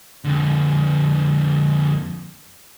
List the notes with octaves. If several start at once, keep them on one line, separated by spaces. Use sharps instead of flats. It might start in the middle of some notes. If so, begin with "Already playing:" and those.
F2 D3